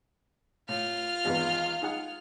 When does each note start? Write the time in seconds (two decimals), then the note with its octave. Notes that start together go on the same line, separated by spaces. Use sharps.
0.69 A2 F4 F6
1.25 G#1 E2 B4
1.82 D#4 G#4 F#5